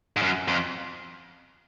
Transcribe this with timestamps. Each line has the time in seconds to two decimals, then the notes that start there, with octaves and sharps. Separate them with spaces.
0.16 G#2
0.22 F#2
0.48 F2